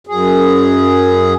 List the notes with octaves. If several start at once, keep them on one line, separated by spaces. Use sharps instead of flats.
F#2 G#4